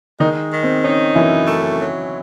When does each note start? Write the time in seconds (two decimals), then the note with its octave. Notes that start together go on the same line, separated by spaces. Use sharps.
0.20 D#3 G#3 D#4
0.52 D#3
0.63 C4
0.84 C#4 D#4
1.15 F#2 E3 E4
1.48 A3
1.80 F#3